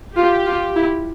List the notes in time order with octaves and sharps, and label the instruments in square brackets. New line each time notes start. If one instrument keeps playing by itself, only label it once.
[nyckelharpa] F4 [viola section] G4
[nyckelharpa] F4
E4